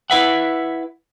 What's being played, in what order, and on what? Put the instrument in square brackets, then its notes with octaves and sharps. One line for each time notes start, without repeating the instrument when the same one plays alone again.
[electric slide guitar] E4 B4 E5 F#5